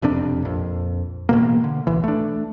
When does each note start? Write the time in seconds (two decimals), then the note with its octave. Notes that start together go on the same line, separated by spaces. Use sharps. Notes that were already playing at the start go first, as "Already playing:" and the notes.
0.02 E1 F2 C3 D4
0.42 A#1 F2
1.29 A1 B2 A#3
1.64 D3
1.87 D1 B1 E3
2.04 A3 D4